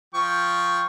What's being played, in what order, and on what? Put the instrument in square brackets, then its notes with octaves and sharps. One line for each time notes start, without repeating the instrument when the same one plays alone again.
[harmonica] F3 G5 C#6